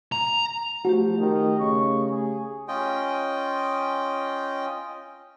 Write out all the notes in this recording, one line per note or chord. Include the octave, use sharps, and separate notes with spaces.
A#5
F3 A3 F#4 G4
D#3 D#5
C#3 C#6
G#4
C#4 F4 D#5 G5